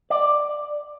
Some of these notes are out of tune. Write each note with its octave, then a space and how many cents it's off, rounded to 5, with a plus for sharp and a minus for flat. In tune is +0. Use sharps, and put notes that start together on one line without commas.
D5 +10